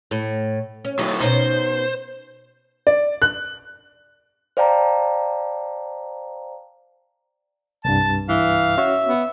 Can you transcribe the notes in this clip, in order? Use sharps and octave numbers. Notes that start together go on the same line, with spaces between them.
A2
C#4
D3 F#3 D#4
B2 C#4 D#4 C5
D5
F#6
C5 D5 F5 G5 A5 A#5
C2 G2 A5
E3 F5
C#4 F#4 C#5 E5
B3